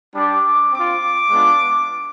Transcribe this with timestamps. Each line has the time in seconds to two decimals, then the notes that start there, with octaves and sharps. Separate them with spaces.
0.14 G3 D4 G4 D6
0.72 C4 F4 D6
1.30 G#3 B3 D4 F4